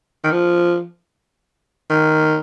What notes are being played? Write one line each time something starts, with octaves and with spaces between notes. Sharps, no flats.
D#3
F3
D#3